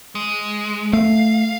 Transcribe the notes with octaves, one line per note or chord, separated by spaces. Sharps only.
G#3
A3 F5